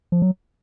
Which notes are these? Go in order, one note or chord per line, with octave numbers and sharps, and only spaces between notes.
F3
F#3